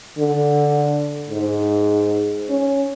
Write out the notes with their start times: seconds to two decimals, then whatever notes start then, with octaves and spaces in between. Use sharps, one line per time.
0.18 D3
1.30 G#2
2.49 C#4